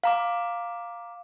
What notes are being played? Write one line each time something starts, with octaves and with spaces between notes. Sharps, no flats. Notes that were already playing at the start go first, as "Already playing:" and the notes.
F5 A#5 D6